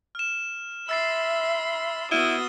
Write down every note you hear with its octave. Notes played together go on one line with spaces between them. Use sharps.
F6 E7
E5 B5 C6 E6 A6 C7
B3 E4 F#4 D#6 F6 D#7 G7